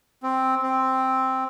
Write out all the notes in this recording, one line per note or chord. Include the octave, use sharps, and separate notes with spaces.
C4
C4